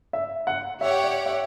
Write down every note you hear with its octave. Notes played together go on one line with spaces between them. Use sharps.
E5
F#5
G4 C#5 E5 F#5
D5
E5